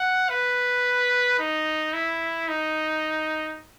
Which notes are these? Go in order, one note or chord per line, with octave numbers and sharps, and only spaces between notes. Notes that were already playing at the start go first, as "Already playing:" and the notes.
Already playing: F#5
B4
D#4
E4
D#4